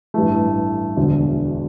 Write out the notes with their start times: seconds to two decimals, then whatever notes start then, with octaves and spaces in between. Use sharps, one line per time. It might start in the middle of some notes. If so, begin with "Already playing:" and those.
0.14 A1 G2 E3 A3
0.97 E1 D2 D3